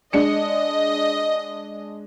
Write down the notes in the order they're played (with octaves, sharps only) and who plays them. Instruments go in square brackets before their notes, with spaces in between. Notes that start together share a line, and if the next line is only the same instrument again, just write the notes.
[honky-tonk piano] G#3 D4 C#7 [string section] D#5